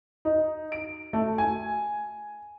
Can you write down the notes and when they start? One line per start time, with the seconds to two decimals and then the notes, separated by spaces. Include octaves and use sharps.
0.25 D#4
0.72 D7
1.13 A3
1.38 G#5